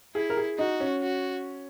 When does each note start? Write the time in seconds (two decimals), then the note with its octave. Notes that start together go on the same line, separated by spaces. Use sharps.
0.15 E4 G#4
0.30 A#4
0.37 G#4
0.58 D#4 F#4
0.80 C#4
1.02 F#4